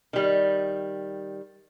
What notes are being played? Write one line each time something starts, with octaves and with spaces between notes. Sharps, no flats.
D#3 G3